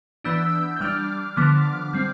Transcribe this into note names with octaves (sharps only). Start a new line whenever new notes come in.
E3 B3 D4 E6 G6
G6
G3 D4 D6 F6
D3 F3 B3 D4 D6 F6
G3 C4